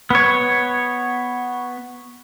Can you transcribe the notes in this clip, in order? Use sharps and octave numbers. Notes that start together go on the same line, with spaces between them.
B3 C#5